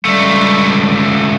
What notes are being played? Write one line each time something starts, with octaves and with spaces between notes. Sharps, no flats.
C#2 G3 A3